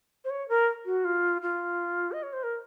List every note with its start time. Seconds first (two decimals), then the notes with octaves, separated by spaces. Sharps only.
0.25 C5
0.30 C#5
0.49 A#4
0.86 F#4
1.05 F4
1.42 F4
2.12 D#5
2.23 C#5
2.33 C5
2.43 A#4